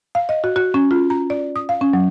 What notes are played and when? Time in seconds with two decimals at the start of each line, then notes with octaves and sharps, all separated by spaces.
0.15 F5
0.29 D#5
0.44 F#4
0.56 F#4
0.74 C#4
0.91 F4
1.10 A#5
1.30 D5
1.56 D#6
1.69 F5
1.81 C#4
1.93 F#3